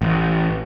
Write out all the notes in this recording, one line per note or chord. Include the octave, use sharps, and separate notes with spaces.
A1